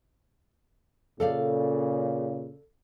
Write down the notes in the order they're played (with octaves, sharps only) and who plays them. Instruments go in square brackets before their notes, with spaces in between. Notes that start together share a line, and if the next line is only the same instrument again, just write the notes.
[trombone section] A#2 C#3 [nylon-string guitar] A4 D5 F5